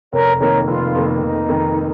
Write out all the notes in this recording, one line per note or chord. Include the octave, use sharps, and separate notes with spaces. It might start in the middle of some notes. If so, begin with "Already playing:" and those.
F1 A#4 C#5
F2 D#3 A#3 A#4 C#5
F1 F4
F2 D#3 A#3
F1 D#4
F2 D#3 A#3